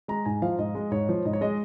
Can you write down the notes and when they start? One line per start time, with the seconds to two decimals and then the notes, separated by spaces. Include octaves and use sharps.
0.08 G#3 A#5
0.26 G#2 G#5
0.42 F3 F5
0.58 G#2 D#5
0.75 G#3
0.91 G#2 C#5
1.09 F3
1.25 G#2 D#5
1.33 C#5
1.41 G#3 D#5